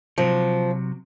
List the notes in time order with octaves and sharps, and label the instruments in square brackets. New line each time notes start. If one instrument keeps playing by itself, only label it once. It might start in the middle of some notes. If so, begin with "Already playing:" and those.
[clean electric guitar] C3 F#3 [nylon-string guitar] F3